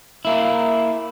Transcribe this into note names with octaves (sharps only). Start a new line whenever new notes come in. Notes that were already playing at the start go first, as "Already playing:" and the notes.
A#3 E4